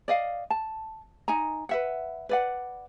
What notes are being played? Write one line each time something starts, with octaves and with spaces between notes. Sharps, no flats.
D5 D#5 F5
A5
D#4 D#5 G#5 A#5
B4 E5 F#5
B4 D5 F#5